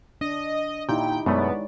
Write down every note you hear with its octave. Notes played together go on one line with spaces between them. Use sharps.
D4 D#5
A#2 D#4 E4 G4 G5
F#2 B2 G#3 A3 B3 C#5 D5